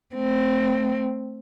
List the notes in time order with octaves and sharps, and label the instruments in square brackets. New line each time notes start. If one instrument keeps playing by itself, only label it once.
[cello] A3 C4